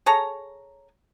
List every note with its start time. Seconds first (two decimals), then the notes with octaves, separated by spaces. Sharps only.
0.06 G#4 A4 C#5 A#5